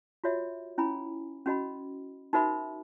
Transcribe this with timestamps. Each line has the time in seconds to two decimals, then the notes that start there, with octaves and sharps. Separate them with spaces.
0.24 F4 F#4 C#5 E5
0.78 C#4 E4 G#5 B5
1.46 C#4 F#4 D#5 B5
2.33 D#4 F#4 A#4 C5 E5 B5